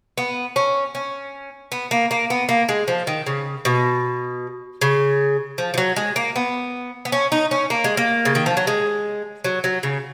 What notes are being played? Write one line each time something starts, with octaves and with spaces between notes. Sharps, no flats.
B3
C#4
C#4
B3
A#3
A#3
B3
A#3
G#3
F3
D#3
C#3
B2
C#3
F3
F3
F#3
G#3
A#3
B3
B3
C#4
D#4
C#4
A#3
G#3
A#3
C#3
D#3
F3
F#3
G#3
F#3
F#3
C#3